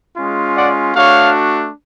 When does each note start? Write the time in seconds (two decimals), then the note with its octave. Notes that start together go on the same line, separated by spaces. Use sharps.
0.17 G#3 C#4 F4
0.56 D5 F#5
0.95 A3 D4 F#4 C#5 F5